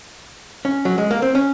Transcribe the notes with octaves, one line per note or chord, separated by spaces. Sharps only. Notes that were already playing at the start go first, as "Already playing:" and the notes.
C#4
F#3
G#3
A#3
C4
C#4